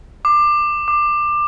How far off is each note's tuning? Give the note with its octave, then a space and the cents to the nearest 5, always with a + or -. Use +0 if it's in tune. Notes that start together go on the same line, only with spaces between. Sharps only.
D6 +20
D6 +20